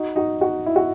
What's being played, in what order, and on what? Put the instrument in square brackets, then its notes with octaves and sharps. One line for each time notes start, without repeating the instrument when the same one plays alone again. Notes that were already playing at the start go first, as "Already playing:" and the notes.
Already playing: [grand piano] D#4 F#4
D#4 F#4
D#4 F#4
E4
F#4